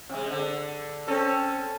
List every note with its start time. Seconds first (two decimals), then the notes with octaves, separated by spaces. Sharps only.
0.09 C3 G#3
0.30 D3
1.08 C4 C#4 A4